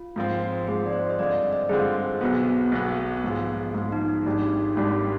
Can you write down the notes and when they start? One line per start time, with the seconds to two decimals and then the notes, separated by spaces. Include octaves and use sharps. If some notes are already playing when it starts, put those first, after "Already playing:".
Already playing: F4
0.16 G#2 F3 C4
0.67 G#2 F3 C4 G#4
0.86 D5
0.93 C5
1.10 D#5
1.18 G2 D3 G#3 C4 F4 D5
1.31 D5
1.35 D#5
1.53 D#5
1.69 G2 D3 G#3 C4 F4 G#4
2.21 B1 B2 B3
2.72 B1 B2 B3
3.24 G#2 F3 G#3
3.74 G#2 F3 G#3 F4
3.92 D#4
4.08 D#4
4.26 G#1 G#2 G3 D4
4.76 G#1 G#2 G3 D4